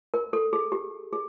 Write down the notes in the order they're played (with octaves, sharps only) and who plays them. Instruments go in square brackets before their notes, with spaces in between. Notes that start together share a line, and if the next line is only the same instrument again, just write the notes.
[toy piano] A#4
A4
G#4
G4
G#4